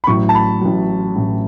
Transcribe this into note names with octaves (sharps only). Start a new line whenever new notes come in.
B5
A1 A2 F#3 C#6
A5
B5
A1 A2 F#3
A1 A2 F#3